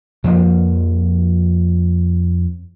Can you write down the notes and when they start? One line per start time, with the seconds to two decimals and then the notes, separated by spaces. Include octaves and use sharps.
0.24 F2 F3 F#3 A#3